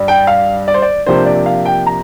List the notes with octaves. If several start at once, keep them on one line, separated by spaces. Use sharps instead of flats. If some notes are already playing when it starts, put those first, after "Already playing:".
Already playing: G2 G3 D4
G5
F5
D5
C5
D5
C3 F3 A#3 D4 C5
D5
F5
G5
A#5